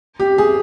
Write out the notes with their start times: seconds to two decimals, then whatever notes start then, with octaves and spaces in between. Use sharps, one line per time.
0.20 G4
0.38 G#4